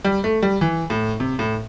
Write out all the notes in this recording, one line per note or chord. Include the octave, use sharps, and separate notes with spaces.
G3
A3
G3
E3
A2
C3
A2